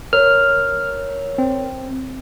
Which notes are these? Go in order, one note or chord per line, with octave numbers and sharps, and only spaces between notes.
A#4 C#5 F6
C4